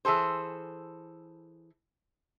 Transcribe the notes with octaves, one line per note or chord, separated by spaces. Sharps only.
E3 G#4 A4 C5